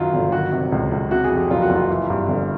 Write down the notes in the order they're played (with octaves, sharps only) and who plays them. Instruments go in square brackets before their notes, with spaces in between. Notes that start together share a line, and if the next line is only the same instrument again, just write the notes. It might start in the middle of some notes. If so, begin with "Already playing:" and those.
Already playing: [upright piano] F#2 D#3 F#3 F4
G1
D#3 F#4
C3
C#2
C#2
C3 F#4
G#4
F2
G4
F#1 F4
F#4
F#1 F4
E3
G2
G1